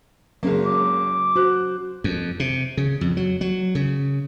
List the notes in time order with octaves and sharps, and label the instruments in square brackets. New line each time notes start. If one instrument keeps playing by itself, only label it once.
[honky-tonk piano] F#1 G#3 A#3 [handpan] F#3 C#4
[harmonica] D6
[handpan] F#4 [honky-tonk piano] C5 F#6
[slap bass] F2
C3
C#3
F2
F#3
F#3
C#3